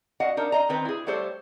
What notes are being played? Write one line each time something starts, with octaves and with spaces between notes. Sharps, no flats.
F#4 D#5 F5 F#5
D4 D#4 A#4
D#5 A#5
D#3 C4 B4 A#5
E4 G#4
F#3 G3 A3 A4 C5 C#5